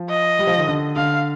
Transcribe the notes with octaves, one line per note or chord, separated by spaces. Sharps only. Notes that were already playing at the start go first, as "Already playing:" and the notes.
Already playing: F3
D#5
G3
F3
D#3
D3
D3 F5